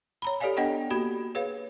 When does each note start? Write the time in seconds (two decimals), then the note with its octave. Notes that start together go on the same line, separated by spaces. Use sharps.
0.22 C#5 A#5 B5
0.40 G4 A4 C#5 D5 F5 G#5
0.57 B3 D4 D#5 F#5 G5
0.91 A#3 F#4 G4 B5
1.35 G#4 B4 C#5 F5